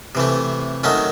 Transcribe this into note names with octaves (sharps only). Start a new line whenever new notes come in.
C3 E3 A3
D#3 F#3 A3 C#4